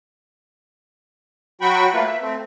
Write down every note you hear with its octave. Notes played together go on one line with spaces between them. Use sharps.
F#3 F#4 G5 B5 C#6
A3 A#3 F4 B4
E5
A3 C4